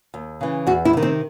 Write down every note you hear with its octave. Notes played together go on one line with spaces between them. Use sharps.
D#2
C#3 E3
E2 F#4
E4
C3 D#3
C4